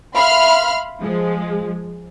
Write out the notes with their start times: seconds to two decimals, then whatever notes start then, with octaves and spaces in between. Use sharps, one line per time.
0.16 E5 F5 B5 C6 F6
1.01 F3 G#3